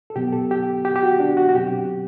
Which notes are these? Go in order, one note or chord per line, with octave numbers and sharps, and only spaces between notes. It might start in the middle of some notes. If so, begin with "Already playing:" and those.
A4
B2 F#3 B3 G4
A4
G4
G4
G4
F#4
D4
F#4
F#4
B2 F#3 C4 G4